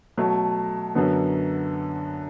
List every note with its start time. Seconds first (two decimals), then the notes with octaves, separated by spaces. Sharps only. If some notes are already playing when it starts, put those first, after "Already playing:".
0.17 B2 F#3 A3
0.95 F#2 D3 F#3 B3